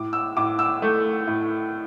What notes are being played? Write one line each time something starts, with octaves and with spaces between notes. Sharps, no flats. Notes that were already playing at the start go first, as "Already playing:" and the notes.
Already playing: A2 D6
E6
A2 D6
E6
A3
A2